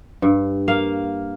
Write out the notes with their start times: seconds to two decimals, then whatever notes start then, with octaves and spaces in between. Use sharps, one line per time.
0.22 G2
0.68 A#3 F5